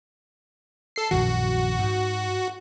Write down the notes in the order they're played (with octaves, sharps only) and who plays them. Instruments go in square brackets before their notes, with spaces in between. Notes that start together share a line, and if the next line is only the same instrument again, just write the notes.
[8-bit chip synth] A4 C7
[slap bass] A#1 F#2 D#3 [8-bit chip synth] F#4
[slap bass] G#2